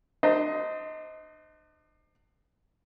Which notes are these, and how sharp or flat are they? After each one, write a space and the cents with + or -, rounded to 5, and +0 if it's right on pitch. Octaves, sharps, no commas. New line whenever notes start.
D4 +40 C5 -15 D#5 +15